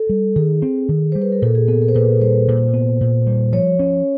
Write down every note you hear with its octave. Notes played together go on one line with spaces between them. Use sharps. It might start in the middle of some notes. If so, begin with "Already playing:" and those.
Already playing: A4
G3
D#3 G#4
C4
D#3
G3 C5
B4
A#4
A#2 A4
G#4
B3 A4
A#4
C5
A#2 B4
G3 C5
A#2
B3
A#2
G3
F3 C#5
C#4